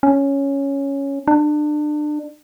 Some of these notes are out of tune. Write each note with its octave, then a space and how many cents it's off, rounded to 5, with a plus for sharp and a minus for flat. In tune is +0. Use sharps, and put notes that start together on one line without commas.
C#4 +0
D4 +30